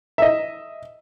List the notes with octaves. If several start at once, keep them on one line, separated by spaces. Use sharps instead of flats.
D#5 E5